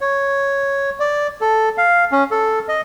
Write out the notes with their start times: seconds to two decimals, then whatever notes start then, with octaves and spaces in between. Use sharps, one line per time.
0.01 C#5
1.00 D5
1.41 A4
1.78 F5
2.12 C#4
2.31 A4
2.69 D#5